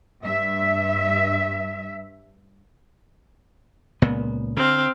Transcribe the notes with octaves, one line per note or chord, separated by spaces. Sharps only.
G2 E5
C#2 A#2 B3
D3 C4 F5